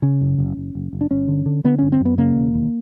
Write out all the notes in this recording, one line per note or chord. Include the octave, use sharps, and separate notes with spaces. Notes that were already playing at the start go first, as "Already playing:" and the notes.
C#3 C#4
F#1
F#1
F#1
F#1
F#1
D4
G1 C#4
D3
D3
D3 B3
G1 C#4
C4
F#2 B3
C#3 A#3
E1
D#2